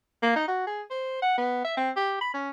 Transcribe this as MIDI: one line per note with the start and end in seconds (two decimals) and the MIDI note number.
0.22 0.34 58
0.36 0.47 63
0.48 0.66 66
0.67 0.82 68
0.90 1.19 72
1.22 1.33 78
1.38 1.61 59
1.64 1.73 76
1.77 1.91 60
1.96 2.19 67
2.21 2.32 83
2.34 2.51 61